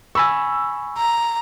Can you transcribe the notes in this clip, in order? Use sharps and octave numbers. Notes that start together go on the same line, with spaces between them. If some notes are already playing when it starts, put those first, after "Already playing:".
G#5 B5 C#6 E6
A#5